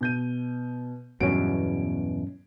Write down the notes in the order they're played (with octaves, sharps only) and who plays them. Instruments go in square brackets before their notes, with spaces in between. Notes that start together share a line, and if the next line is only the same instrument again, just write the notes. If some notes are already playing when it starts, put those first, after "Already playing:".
[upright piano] B2 G6 D#7
[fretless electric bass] E2 B2 [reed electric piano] G2 F#3 C#4 [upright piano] D7